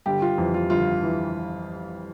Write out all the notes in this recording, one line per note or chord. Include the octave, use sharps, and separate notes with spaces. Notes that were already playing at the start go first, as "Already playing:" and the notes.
G1 G4
F4
F2 E3
F4
G1 F4
E3